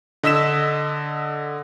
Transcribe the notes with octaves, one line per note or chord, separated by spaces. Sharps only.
D3 D#5 E6 B6 E7